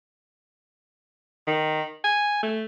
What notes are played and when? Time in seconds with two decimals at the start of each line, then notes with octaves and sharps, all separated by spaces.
1.48 D#3
2.04 G#5
2.43 A3